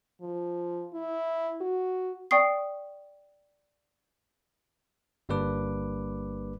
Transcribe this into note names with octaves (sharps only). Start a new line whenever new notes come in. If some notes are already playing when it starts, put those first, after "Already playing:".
F3
E4
F#4
D5 G5 C#6 D#6 C7
G1 G3 A#3 D4 B4 D6